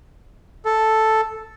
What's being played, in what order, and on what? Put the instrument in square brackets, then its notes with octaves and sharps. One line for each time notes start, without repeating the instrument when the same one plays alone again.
[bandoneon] A4